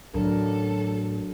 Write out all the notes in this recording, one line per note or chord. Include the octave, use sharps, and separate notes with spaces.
A1 D2 F#3 D4 A4 A#4